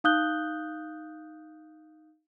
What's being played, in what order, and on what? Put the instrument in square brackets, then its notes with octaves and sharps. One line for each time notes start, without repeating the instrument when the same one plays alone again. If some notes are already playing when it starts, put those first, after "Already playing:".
[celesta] D#4 F5 D#6 F#6 G6 G7